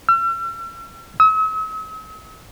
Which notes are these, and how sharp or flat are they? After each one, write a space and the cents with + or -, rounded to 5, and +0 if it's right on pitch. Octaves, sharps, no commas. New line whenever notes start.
E6 +45
E6 -45